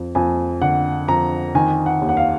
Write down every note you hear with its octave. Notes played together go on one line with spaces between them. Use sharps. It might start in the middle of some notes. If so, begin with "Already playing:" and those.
Already playing: F2
F2 G#5
D3 F#5
F2 A#5
D#3 G#5
F#5
D#2
F#5
F5